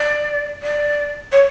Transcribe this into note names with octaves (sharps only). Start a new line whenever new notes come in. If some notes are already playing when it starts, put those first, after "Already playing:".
Already playing: D5
D5
C#5